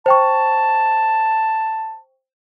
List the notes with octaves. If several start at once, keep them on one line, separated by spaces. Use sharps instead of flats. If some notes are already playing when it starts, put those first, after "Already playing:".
C5 G5 A5 C#6